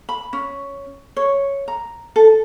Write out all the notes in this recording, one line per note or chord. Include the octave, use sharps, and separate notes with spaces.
B5
C#4
C#5
A#5
A4